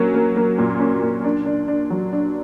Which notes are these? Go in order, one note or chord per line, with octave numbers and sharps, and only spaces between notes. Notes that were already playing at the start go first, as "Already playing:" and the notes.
Already playing: F#3 A#3 C#4
A#3
A#3
A#2
C#4
A#2
D4
D4
D4
F#3
D4